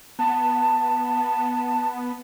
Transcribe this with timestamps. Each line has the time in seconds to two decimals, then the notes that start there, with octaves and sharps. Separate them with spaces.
0.19 B3 A5